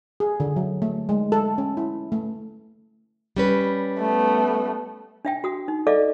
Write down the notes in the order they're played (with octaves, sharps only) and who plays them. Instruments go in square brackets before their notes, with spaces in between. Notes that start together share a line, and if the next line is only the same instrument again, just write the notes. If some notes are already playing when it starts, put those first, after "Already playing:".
[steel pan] G#4
D3
F#3
A3
G#3
A4
C#4
E4
A3
[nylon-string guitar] G3 C#4 B4
[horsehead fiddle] A3 B3
[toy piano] D4 E5 G5
F#4 D#6
D#4
A4 D5 D#5 F5 D6